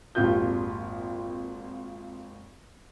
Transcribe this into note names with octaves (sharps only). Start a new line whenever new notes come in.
G#1 F2 A#2 F4 G4 G6